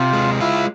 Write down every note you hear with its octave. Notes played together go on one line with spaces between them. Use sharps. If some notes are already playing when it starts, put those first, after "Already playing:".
Already playing: C3 F4
G#3
E4 F4